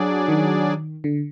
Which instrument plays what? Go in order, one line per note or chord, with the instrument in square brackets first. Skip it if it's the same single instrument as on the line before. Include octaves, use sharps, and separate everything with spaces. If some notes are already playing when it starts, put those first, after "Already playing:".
Already playing: [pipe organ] F#3 D4 G#4 D5
[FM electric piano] D#3
D3